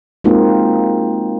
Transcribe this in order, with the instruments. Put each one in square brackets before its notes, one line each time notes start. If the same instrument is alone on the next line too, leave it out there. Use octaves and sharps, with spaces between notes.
[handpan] G#3 A#3 C4 D#4 F4 F#4